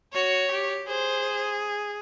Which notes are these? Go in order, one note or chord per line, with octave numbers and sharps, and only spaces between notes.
F#4 C#5
G4
G#4 C5